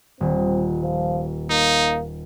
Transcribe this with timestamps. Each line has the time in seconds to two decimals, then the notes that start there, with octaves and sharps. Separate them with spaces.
0.21 D#1 C4
0.82 F3
1.50 A#3 D#4